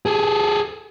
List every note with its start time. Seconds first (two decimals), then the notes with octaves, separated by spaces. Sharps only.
0.06 G#4 A4